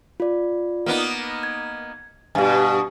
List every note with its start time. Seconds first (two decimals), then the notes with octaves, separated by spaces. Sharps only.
0.20 F4 D5
0.86 A#3 B3 D#4
1.43 G#6
2.35 G2 B2 G4 F5 G#5